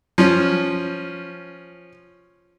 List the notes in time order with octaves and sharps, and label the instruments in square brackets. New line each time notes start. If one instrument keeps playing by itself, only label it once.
[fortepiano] F3 C#4